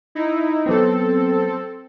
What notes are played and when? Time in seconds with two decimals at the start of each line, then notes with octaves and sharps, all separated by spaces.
0.15 D#4 E4
0.66 F#3 B3 C4 A4